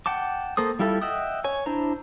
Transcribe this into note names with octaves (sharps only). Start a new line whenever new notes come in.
F#5 G5 A5 D6
A#3 A4 C5 D#6
G3 E4 F4 G4 A4
D#5 E5 F#5 G5 D#6
C#5 G#5
D4 E4 C5 A#5